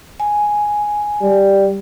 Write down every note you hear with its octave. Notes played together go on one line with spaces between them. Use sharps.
G#5
G3